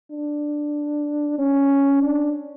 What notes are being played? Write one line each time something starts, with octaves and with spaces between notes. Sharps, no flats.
D4
C#4
D4